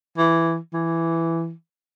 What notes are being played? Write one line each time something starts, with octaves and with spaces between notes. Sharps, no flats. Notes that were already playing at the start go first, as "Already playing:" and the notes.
E3
E3